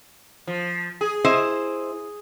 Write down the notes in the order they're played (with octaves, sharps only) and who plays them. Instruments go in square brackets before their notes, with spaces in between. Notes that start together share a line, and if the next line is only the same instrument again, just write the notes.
[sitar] F3
G#4
[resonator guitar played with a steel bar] E4 C5 D#5